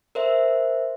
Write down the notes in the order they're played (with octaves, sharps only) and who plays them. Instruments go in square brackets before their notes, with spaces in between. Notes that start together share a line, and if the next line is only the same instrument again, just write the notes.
[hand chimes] A#4 C5 E5